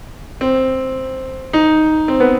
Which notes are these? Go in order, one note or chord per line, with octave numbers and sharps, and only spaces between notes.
C4
D#4
C4
B3